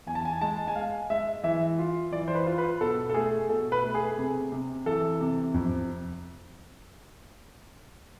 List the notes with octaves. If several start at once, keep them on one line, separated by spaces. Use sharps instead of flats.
E2 G#5
A5
G#5
G#3 A5
G#5
G#3 F5
G#3 E5
E3 E5
F4
E3 D5
C5
B4
F4
B4
B2 A4
A4
A3 G#4
B2 A4
B4
A3
G#4
C3
C3
E3 A4
C3
F2